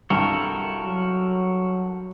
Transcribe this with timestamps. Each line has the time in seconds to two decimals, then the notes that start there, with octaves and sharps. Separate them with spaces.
0.10 C2 G2 F#4 A4 A#4
0.86 F#3